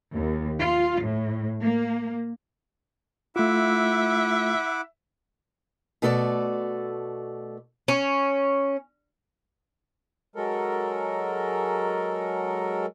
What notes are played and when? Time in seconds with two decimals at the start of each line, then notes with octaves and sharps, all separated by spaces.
0.13 D#2
0.60 F4
1.03 A2
1.63 A#3
3.36 A3 E4 F4 E5 F#5 D6
6.02 B2 A3 F#4 A4 B4 D5
7.88 C#4
10.36 F#3 G#3 A4 A#4